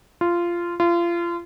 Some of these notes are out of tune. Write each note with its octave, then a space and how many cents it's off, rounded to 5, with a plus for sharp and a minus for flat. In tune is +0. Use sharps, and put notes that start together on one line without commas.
F4 -15
F4 -30